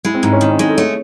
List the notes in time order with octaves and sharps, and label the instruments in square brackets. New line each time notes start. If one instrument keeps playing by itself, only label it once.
[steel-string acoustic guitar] G#3 [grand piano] E4
[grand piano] C4
[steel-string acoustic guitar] G#2 [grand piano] D#4
[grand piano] C#4
[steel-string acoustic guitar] D#3 [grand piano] D#4
[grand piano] C#4
[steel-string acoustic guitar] G#3 [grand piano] D#4
[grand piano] A4
[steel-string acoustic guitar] A3 [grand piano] C#5